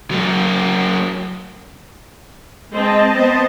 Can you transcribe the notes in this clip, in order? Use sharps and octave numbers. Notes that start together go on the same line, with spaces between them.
F#3 A#3
G#3 C4 D#5 A5
B3 C4 C5